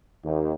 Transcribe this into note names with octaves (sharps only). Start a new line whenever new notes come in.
D#2